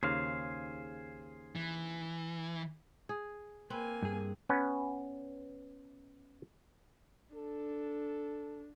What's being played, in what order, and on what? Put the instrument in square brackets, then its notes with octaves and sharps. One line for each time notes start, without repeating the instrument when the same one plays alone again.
[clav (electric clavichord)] D#2 C#3 [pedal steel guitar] G#4 C5 F5
[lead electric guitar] E3
[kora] G#4
[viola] A#3 G#5 [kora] C4 B4
[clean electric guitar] G2 G#4
[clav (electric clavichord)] B3 C#4 B4
[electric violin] D4 [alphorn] A4